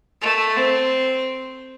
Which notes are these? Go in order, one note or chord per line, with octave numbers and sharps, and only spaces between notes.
A3
C4